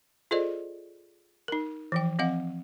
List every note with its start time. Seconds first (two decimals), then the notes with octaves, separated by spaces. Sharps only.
0.31 F4 G#4 A4 C5 D5 D#5
1.48 D#4 A#4
1.92 E3 F3 G5
2.19 F3 C4 D#5 F5 F#5